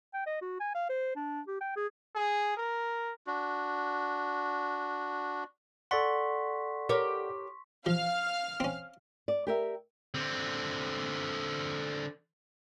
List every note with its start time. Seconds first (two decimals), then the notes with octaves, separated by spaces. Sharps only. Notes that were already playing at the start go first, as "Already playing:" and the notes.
0.14 G5
0.26 D#5
0.42 F#4
0.60 G#5
0.75 F5
0.89 C5
1.16 D4
1.48 G4
1.61 G5
1.76 G#4
2.15 G#4
2.57 A#4
3.27 D4 F#4
5.91 A4 D5 F#5 C6 C#6 B6
6.89 G4 A#4 C#5
7.86 F3 F5 F6
8.60 C4 C#4
9.28 D5
9.47 G4 A#4 E5
10.14 D3 C4